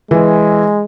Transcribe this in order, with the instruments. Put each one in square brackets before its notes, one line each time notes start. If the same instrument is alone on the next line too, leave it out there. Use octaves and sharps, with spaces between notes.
[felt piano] E3 [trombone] G#3